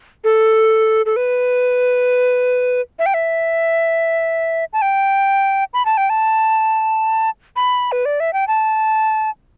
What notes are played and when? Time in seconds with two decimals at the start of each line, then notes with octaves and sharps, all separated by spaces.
0.24 A4
1.06 A4
1.16 B4
2.99 E5
3.06 G5
3.14 E5
4.73 A5
4.82 G5
5.74 B5
5.85 A5
5.97 G5
6.10 A5
7.56 B5
7.92 B4
8.05 D5
8.20 E5
8.33 G5
8.48 A5